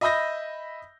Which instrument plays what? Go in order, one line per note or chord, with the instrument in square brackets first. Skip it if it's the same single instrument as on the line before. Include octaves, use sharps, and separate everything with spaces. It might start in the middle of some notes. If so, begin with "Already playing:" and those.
[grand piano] D#5 E5 B5 D#6 G6 A#6